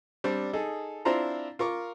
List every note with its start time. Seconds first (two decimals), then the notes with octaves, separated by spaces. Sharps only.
0.24 G3 C4 D4
0.53 D#4 G#4 A4
1.05 C4 D4 E4 F4 C5 A#5
1.59 F4 A#4 C#6 D6